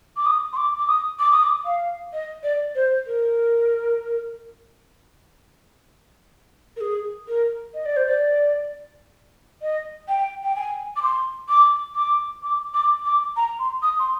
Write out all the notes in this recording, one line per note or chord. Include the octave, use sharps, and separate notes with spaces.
D6
D#6
C6
D6
D6
D#6
D6
D#6
D6
F5
D#5
D5
C5
A#4
A#4
G#4
A#4
D#5
D5
C5
D5
D#5
G5
G5
G#5
D6
C6
D6
D6
D6
D6
D6
A#5
C6
D#6
C6